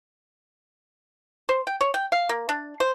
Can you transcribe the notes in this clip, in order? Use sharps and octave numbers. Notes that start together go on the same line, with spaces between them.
C5
G5
C#5
G5
F5
A#3
D4
C5